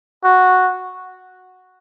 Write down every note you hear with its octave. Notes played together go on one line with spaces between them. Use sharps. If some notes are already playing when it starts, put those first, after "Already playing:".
F#4